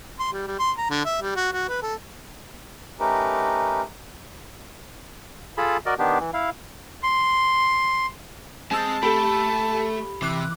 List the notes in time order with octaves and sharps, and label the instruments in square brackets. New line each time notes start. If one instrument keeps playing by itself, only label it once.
[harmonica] C6
G3
G3
C6
A#5
D3
E5
G3
F#4
F#4
B4
A4
[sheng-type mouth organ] A3 C#4 D#4 G4 A#4 B4
[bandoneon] F4 G#4 A4 A5 B5
F#4 A#4 D5 D#5
D#3 B3 D4 G4
E3
E4 F5
[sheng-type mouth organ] C6
[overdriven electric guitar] G#3 [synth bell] C4 E6 A6 [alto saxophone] A5
[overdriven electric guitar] A3 [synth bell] G4 A4 [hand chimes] B5
[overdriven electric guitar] C3 [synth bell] E3 D6 F#6